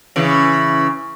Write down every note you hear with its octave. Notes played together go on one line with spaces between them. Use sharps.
C#3 E3